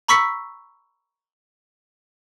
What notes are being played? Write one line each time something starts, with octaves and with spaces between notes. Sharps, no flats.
A#5 B5 C#6 E6 B6 C#7